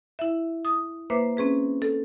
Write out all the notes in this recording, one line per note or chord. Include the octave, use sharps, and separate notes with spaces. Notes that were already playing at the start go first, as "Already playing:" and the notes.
E4 E5
D#6
A#3 B4 C5 E5 D6
C4 C#4 G#4 B4
A4